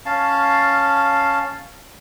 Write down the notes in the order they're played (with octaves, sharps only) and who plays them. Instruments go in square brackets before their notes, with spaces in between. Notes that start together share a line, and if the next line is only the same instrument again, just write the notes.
[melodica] C#4 F5 A5